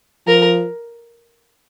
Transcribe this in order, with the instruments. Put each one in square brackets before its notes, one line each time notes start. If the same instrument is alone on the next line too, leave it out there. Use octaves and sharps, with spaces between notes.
[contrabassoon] F3 [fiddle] A#4